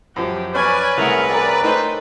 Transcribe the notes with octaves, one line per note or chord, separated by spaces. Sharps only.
F#2 F3 G4
C#4 B4 C#5 D5 G#5 B5
C2 A3 G#4 A#4 F#5
A#4 D5 G5
A3 D#4 B4 C5